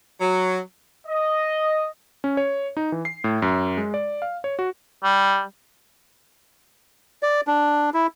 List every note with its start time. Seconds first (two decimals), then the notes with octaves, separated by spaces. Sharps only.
0.21 F#3
1.07 D#5
2.24 C#4
2.37 C#5
2.77 D#4
2.92 E3
3.05 C7
3.24 A2
3.42 F#2
3.77 G#3
3.94 D5
4.22 F5
4.44 C#5
4.59 F#4
5.04 G3
7.23 D5
7.47 D4
7.94 E4